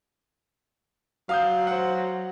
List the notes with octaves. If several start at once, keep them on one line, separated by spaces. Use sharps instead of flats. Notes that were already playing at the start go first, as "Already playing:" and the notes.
F#3 F5 D#6 G6
C5 F#5